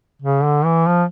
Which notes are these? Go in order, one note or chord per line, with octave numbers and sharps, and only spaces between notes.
C#3
D3
E3
F3